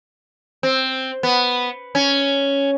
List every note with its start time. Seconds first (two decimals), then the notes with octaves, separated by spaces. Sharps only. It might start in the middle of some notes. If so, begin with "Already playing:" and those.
0.63 C4
1.23 B3
1.95 C#4